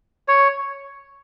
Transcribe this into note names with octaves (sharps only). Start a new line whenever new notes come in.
C#5